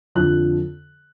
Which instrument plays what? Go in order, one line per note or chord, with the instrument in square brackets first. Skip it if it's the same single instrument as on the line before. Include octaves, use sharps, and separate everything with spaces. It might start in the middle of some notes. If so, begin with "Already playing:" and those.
[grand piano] F2 D3 F3 F#6